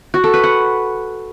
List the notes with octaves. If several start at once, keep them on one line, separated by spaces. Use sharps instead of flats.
F#4
A4
B4
F#5